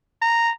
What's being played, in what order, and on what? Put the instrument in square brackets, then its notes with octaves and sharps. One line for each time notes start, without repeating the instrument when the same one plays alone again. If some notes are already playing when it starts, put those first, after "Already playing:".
[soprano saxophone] A#5